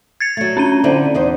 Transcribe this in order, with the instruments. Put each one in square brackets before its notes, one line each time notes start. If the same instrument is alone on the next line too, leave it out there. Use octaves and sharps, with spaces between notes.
[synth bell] G#6 A6 C#7
[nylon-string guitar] F#3 A3
[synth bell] C#4 D4 D#7
[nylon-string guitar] D3 C4 E4
E2 D#4 C5